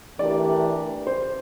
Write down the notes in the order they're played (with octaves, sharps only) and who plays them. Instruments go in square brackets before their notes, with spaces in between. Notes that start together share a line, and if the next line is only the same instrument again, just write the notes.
[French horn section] E3 A3 D4 G4 A#4 [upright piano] D5
[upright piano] C5